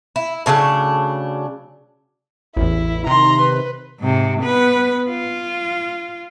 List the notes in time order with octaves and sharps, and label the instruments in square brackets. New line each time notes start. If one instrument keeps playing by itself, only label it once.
[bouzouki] E4
A2 C#3 F#3 D4
[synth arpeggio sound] A1 E2 [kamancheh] E4
[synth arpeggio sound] C3 D#3 [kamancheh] A#5 C6
[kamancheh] B4
[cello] G#2 C3
B3 B4
F4